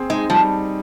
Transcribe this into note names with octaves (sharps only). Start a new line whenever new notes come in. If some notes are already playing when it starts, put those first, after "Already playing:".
Already playing: C4 G#4
G#3 D#4
F3 G3